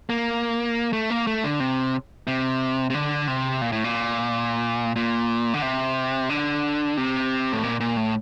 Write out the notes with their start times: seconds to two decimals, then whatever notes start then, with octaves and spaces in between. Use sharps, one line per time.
0.09 A#3
0.93 A3
1.10 A#3
1.27 A3
1.44 D3
1.60 C3
2.27 C3
2.90 C3
2.94 D3
3.28 C3
3.62 A#2
3.72 A2
3.84 A#2
4.96 A#2
5.54 D3
5.62 C3
6.30 D3
6.97 C3
7.52 A2
7.63 A#2
7.80 A#2
7.97 A2